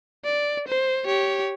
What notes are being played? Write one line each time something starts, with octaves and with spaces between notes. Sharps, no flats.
D5
C5
G4 C#5